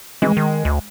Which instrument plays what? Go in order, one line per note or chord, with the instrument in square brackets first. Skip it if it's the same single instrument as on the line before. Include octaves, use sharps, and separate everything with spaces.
[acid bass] E3 [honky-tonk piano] G#3
[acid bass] D#3
D2